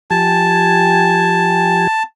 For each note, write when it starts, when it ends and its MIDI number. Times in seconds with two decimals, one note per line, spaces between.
0.11 1.87 53
0.11 1.87 67
0.11 1.87 80
0.11 2.03 81